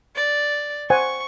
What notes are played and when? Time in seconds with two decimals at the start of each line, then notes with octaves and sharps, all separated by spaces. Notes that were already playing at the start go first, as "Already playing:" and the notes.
0.15 D5
0.90 C5 F#5 G#5 C#6